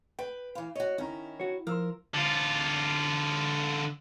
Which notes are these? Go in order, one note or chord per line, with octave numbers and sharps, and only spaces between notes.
B4 G5
E3 F5
F#4 C#5 D#5
D#3 C#4 E4 A#5
F#4 C#5
F3 A#4 C6 E6 F6
D3 F4